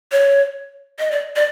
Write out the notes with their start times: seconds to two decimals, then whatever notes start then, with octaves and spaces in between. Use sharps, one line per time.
0.12 C#5
0.99 D#5
1.11 D5
1.36 D5